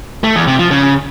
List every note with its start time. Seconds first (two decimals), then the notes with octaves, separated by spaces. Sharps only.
0.24 A3
0.36 E2
0.47 C3
0.59 F3
0.71 C#3